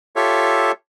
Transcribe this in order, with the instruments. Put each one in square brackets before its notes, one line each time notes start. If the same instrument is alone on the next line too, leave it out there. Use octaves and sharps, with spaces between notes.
[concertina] F4 G4 A4 C#5 E5